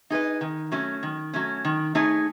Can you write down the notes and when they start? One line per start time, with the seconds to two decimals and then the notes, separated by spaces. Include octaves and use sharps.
0.10 D#4 G#4 B4 D#5
0.41 D#3
0.72 F#3 A3 C#4
1.03 D#3
1.33 F#3 A3 C#4
1.65 D#3
1.95 A3 D#4 G#4 C#5